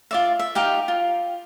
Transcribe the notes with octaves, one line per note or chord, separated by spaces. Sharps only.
F4 D5 E5
E5
D#4 G4 F5 G5
F4